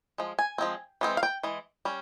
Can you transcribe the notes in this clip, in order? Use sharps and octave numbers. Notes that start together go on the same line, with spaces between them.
F3 G#3
G#5
F3 G#3 C4
E3 G#3 C4
F5
G5
E3 G#3
G3 C#4